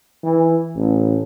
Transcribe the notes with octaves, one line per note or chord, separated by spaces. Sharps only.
E3
A1